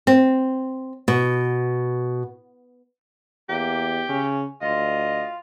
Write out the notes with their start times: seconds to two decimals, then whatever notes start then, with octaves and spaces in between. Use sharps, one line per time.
0.07 C4
1.08 B2
3.49 E2 A#3 G4
4.09 C#3 C#4
4.61 D2 F4 D#5